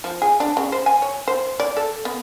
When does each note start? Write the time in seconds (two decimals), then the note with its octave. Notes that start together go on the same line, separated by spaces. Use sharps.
0.04 F3
0.22 G#4
0.40 D4
0.57 C#3
0.72 C5
0.86 G#5
1.02 C#5
1.28 C5
1.60 D5
1.77 A4
2.05 B3